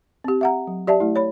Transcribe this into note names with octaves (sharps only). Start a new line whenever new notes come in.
C4 G4
E5 F#5 A#5
F#3
G4 D5 E5 A5
A3 E4
C#5 B5